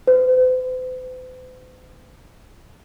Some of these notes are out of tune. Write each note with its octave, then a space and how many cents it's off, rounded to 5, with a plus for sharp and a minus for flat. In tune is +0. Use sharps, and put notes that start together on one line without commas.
C5 -45